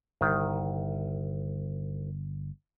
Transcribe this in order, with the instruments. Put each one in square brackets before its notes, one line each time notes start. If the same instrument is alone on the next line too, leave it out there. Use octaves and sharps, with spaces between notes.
[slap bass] G1 [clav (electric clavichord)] C2 D#3